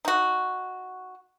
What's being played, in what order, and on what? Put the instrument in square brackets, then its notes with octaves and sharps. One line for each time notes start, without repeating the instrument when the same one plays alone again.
[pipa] D#4 F#4